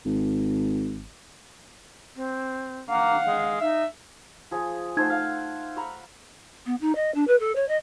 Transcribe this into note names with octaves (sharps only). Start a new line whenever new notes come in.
G#1
C4
A#3 F5 F#5
G#3
D#4 E5
F3 G#4
A3 D#4 C5 F#5 G#6
F5 F#5
A#5 B5 C#6
B3
D#4
D#5
D4
B4
A4
C#5
D#5